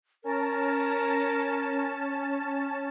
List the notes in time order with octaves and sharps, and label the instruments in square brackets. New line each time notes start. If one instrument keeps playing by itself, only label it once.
[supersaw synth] C#4 A5 [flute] A#4